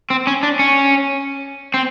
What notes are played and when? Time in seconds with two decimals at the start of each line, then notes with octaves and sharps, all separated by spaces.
0.10 C4
0.27 C#4
0.43 D4
0.59 C#4
1.74 C4